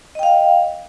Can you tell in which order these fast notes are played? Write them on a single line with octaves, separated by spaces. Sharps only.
D#5 G5 F5